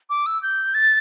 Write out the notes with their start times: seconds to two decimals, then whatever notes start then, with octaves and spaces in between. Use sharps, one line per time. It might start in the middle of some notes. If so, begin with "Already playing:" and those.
0.10 D6
0.26 E6
0.43 G6
0.74 A6